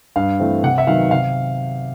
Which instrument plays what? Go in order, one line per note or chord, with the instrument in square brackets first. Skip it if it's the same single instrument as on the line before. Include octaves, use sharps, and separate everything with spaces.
[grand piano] G2 F5
E3 A3 C4
C3 F#5
E5
D#3 F#3 B3 F5
C3 F5